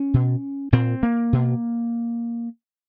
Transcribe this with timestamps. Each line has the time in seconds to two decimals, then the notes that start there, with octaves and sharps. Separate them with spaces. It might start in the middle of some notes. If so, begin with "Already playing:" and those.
Already playing: C#4
0.14 B2
0.72 A#2 C4
1.03 A#3
1.33 B2